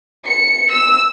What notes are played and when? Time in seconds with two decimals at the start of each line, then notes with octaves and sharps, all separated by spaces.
0.25 C#7
0.71 E6